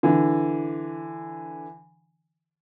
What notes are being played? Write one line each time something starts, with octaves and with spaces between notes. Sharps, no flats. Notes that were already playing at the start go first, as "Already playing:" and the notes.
D3 E3